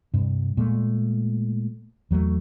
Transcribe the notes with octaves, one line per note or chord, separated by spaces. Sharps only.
G2 C3
A#2 G#3 A3
E2 F#3 G3 A3